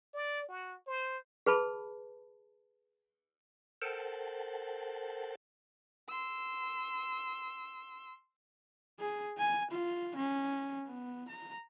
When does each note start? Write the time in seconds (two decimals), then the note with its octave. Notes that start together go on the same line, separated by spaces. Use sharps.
0.14 D5
0.48 F#4
0.87 C5
1.46 G#4 B4 A5 B5
3.82 A4 A#4 C5 F#5 G5 A5
6.09 C6 E6
9.00 G#4
9.38 G#5
9.71 F4
10.16 C#4
10.87 B3
11.29 A#5